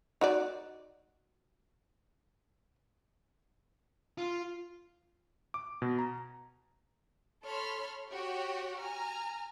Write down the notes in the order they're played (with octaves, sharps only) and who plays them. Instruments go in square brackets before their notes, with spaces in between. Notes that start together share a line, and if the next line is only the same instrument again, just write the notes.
[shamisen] D#4 F#4 D5
[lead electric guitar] F4
[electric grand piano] D6
B2
A#5
[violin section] A4 C#5 B5 C6 F6
F#4 G4 C#5 F#5 G5
G#5 A#5 F6